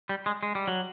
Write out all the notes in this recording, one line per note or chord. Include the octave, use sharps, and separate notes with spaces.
G3
G#3
G#3
G3
F#3